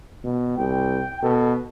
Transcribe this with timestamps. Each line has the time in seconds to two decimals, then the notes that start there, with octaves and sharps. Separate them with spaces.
0.24 B2
0.57 C2 G5
1.23 B2 A4